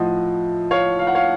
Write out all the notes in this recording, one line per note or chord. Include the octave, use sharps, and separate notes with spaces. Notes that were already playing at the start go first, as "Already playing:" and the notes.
Already playing: A2 F3 D#5 F#5
C#5 F5
F5
F#5
C#5 F5